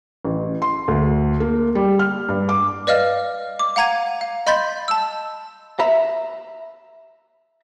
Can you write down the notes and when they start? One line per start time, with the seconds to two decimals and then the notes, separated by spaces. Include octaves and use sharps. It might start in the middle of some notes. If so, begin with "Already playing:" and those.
0.25 A1
0.62 C6
0.88 D2
1.40 A#3
1.75 G3
1.99 F6
2.29 G2
2.49 D6
2.87 B4 D5 D#5 F5 F6
3.59 D6
3.76 F5 F#5 A#5 G#6 D#7
4.21 F5
4.47 D#5 B5 C6 G6 A6 B6
4.88 A5 E6
5.79 E5 A#5 B5